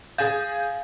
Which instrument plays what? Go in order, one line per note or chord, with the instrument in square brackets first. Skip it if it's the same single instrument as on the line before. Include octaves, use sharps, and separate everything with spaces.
[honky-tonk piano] G#4 G#5 A6 [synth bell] F5 G6